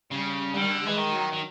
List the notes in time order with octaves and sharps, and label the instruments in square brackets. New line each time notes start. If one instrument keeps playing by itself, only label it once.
[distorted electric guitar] C#3 [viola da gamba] G3
[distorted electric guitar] D3 [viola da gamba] G3
[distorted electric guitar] D#3
D3
[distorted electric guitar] E3 [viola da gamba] G#3
[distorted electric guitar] D#3
[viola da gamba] F#3
[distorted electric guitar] D#3